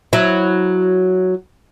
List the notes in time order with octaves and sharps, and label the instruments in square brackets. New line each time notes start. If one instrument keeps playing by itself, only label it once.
[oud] F#3 E4